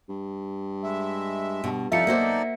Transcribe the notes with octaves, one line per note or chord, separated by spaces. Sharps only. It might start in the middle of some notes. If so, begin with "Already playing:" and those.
G2
G#3 E5
G2 B2
C2 F3 D#4 F4 A4 D5 E5 C#7
B1 A#3 F#4 C5